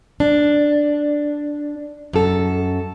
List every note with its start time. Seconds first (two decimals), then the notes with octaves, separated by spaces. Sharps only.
0.20 D4
2.13 F#2 A4